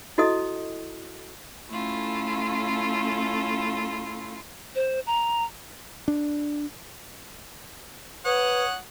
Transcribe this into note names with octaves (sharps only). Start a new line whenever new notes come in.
E4 F#4 A4 D#5 D#6
A3 C#4 E4 F4 A4
C5
A#5
D4
B4 C#5 F#5 D#6